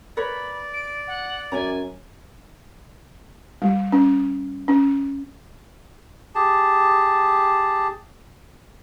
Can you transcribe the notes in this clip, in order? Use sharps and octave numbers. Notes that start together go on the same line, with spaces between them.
A#4 B4 C#5 D5 B5
D7
F#5
F#2 C#4 C#5 G#5 A#5
G3
C#4
C#4
G4 G#4 A5